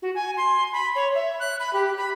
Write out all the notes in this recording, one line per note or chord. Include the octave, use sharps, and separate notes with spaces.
F#4
G#5
C6
B5
C#5
E5
F#6
B5
G4
B5